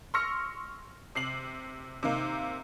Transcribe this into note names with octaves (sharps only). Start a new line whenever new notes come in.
C6 C#6 E6 F6 A#6 C#7
C3 C7 F#7
C3 D#3 A#3